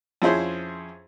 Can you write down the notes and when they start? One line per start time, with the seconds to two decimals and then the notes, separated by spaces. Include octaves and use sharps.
0.22 F2 F3 C#4 E4 G#4 C5